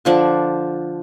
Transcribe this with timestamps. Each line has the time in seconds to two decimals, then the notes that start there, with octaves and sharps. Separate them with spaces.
0.05 D3 F3 D4